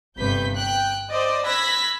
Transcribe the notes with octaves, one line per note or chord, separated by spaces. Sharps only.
G1 G2 C3 B4 G6 B6
G5 F#6
C5 D5 D#5
B5 E6 F#6 G#6 A#6 B6